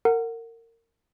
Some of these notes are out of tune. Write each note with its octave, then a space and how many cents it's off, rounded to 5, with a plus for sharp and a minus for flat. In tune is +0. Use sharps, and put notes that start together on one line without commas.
A#4 -25 F#5 +0